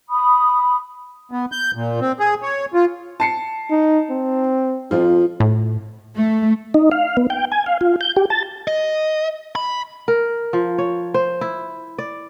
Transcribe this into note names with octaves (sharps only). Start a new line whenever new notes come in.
B5 D#6
B3
G6
A#2
C4
G#4
C#5
F4
A5 C7 C#7
D#4
C4
F2 F3 F4
A2
A3
D#4
F5
B3
G5
G#5
F5
F4
G6
G4
A5
D#5
B5
A#4
F3
C#5
C5
E4
D5